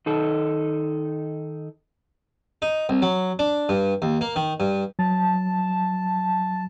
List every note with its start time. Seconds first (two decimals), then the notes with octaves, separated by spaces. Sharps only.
0.06 D#3 D#4 A4
2.62 D#4
2.89 C2
3.02 F#3
3.39 D4
3.69 G2
4.02 D#2
4.21 A#3
4.36 D#3
4.60 G2
4.99 F#3 A5